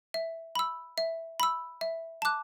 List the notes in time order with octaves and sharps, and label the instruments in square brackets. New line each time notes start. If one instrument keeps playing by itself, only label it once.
[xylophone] E5
B5 E6
E5
B5 E6
E5
A5 D6 F#6